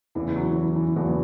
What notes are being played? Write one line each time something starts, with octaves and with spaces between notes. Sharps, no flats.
E2 C#3 E3
F#3
E3
F#3
E3
E2 C#3 E3 F#3